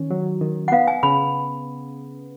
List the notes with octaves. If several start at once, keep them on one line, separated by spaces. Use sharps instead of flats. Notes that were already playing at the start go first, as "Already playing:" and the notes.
Already playing: D#3 C#4
F#3
D#3
F#5
B3 F5
G#5
C#3 B5